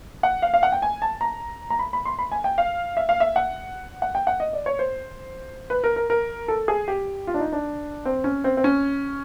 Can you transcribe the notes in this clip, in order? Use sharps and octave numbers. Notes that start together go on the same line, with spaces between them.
F#5
F5
F5
F#5
G5
G#5
A5
A#5
A#5
B5
B5
C6
B5
G#5
G5
F5
E5
F5
E5
F#5
F#5
G5
F#5
D#5
D5
C#5
C5
B4
A#4
A#4
A#4
A4
G#4
G4
F4
D4
D#4
D4
C4
C#4
C4
C4
C#4